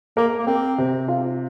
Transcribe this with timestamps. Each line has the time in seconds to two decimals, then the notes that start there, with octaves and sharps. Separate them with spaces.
0.17 A#3 A#4
0.39 A#3
0.47 C4 A#4
0.78 C3
1.08 F4